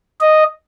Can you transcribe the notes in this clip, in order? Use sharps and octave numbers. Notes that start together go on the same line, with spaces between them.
D#5